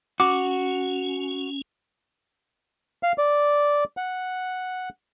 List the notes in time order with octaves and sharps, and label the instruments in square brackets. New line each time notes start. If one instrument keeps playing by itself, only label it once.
[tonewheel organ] C#4 [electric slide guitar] F#4 [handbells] D6
[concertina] F5
D5
F#5